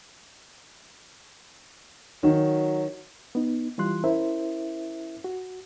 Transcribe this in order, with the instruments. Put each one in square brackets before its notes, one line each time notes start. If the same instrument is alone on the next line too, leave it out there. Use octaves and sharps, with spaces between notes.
[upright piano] D#3 [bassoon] F#3
[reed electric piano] B3 D#4
E3 G3 F4 C6 F#6
C#4 E4 A#4 C5 E5
F#4